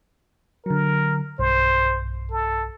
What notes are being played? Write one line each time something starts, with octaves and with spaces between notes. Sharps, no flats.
D3 F#3 A#4
B1 G2 C5
A4